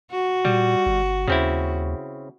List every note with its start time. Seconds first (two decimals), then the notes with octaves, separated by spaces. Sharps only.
0.11 F#4
0.45 A#2 G3
0.86 G1
1.28 D#2 C#3 C4 E4